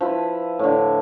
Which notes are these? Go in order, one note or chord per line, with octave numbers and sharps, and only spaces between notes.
F3 E4 B4
A2 D3